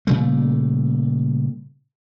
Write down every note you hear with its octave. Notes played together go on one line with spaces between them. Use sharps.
A#2 C#3 G3 A3